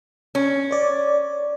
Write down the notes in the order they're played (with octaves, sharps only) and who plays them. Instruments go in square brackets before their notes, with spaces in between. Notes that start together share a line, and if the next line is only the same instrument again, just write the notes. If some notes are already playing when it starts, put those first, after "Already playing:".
[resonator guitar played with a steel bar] C#4
[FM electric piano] C#5 D5